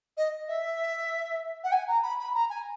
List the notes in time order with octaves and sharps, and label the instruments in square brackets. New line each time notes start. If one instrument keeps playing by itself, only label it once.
[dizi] D#5
E5
F#5
G#5
A#5
B5
B5
A#5
G#5